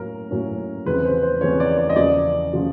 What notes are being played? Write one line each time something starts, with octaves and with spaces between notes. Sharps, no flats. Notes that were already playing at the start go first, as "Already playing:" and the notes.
Already playing: A2 F#3 A#3 C#4 A#4
A2 F#3 A#3 C#4
E2 C#3 F3 G#3 C4 B4
C5
C5
E2 C#3 F3 G#3 C4 C#5
D5
D5
D#5
E2 C#3 F3 D5
C#3 F3